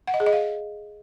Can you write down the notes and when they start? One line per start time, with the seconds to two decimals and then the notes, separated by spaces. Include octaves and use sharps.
0.07 F#5
0.14 D#5
0.20 G#4
0.26 D#5
0.33 F5